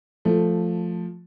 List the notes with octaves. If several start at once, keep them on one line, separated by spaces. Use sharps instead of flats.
F3 A3